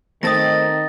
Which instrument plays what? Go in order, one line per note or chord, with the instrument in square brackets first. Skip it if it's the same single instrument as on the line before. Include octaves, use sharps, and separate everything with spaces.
[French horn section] D#3 [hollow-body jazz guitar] A3 C4 A4 [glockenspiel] D#6 A6 A#6